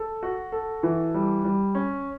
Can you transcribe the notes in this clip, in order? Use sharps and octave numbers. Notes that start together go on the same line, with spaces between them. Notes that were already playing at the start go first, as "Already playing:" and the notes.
Already playing: A4
F#4
A4
E3
G3
G3
C#4